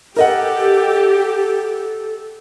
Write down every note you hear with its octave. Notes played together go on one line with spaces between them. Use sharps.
G4 A4 A#4 D#5 F#5